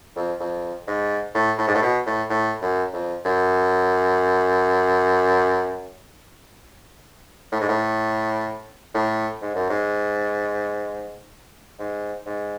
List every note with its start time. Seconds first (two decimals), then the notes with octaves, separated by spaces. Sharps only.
0.16 F2
0.40 F2
0.87 G#2
1.35 A2
1.59 A2
1.68 G#2
1.75 A2
1.82 B2
2.06 A2
2.30 A2
2.62 F#2
2.93 F2
3.25 F#2
7.52 A2
7.61 G#2
7.68 A2
8.94 A2
9.42 G#2
9.55 F#2
9.69 G#2
11.79 G#2
12.26 G#2